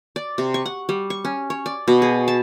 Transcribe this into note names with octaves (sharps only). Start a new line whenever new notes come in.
D5
C3
C#6
F#5
G3
C#6
C#4
C#5
D5
B2
G#4
A5